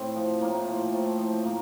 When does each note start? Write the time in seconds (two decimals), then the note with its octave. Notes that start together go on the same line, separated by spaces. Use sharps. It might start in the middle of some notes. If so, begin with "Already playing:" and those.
Already playing: A2 C4
0.16 F3
0.41 A2 A#3
0.68 F3
0.93 A2 A3
1.18 F3
1.44 A2 A#3